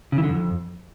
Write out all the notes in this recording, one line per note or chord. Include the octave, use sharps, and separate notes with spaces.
C#3
E3
D3
F2